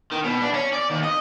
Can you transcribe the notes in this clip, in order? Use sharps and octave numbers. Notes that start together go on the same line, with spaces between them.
D#3
B2
D4
C#4
D5
D#2
D#5